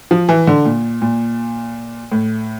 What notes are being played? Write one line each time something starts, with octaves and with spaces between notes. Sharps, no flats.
F3
E3
D3
A#2
A#2
A2